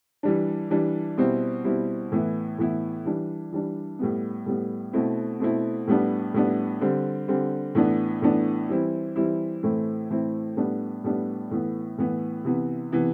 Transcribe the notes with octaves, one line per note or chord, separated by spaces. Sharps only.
E3 G3 D4
E3 G3 D4
B2 G3 C4 E4
B2 G3 C4 E4
A2 E3 B3 E4
A2 E3 B3 E4
E3 G3 D4
E3 G3 D4
A2 G3 B3
A2 G3 B3
B2 A3 C4 E4
B2 A3 C4 E4
A2 G3 B3 D4
A2 G3 B3 D4
D3 G3 C4
D3 G3 C4
A2 E3 B3 D4
A2 E3 B3 D4
E3 G3 C4 E4
E3 G3 C4 E4
A2 E3 A3 C4 E4
A2 E3 A3 C4 E4
A2 G3 B3 D4
A2 G3 B3 D4
A2 E3 B3
A2 E3 B3
C3 E3 B3
C3 E3 B3